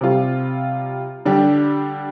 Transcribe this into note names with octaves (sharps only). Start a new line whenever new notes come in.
C3 G3 F4
D3 G3 D4 G4